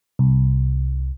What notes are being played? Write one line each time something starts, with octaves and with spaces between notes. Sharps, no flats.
C2